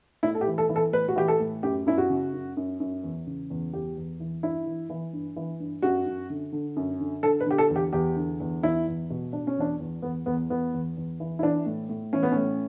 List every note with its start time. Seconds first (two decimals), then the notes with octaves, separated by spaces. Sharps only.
0.23 A2 E4
0.35 A4
0.41 G4
0.47 E3
0.58 A4
0.69 E3
0.76 A4
0.92 A2 B4
1.08 F#4
1.16 E3 G4
1.28 A4
1.40 A2
1.63 F#2 G4
1.86 F#2 E4
1.98 F#4
2.10 C#3
2.33 F#2
2.57 F#2
2.80 F#2
3.03 E2
3.27 C#3
3.50 E2
3.73 E2 G4
3.97 E2
4.20 E3
4.43 G2 E4
4.66 E3
4.90 E3
5.13 G2
5.36 E3
5.60 G2
5.82 F#2 F#4
6.06 F#2
6.30 D3
6.53 D3
6.76 F#2
7.00 D3
7.23 D3 A4
7.40 B4
7.46 D3 G4
7.58 A4
7.70 E2
7.76 G4
7.93 E2 G4
8.16 D3
8.40 E2
8.63 E2 E4
8.87 E2
9.10 B2
9.33 B2 D4
9.47 C#4
9.57 E2 D4
9.80 E2
10.02 E2 B3
10.26 E2 B3
10.50 E3 B3
10.73 E2
10.97 E2
11.20 E3
11.39 E4
11.43 E3 D4
11.66 A2
11.89 A2
12.13 E3 C#4
12.23 B3
12.32 A2 C#4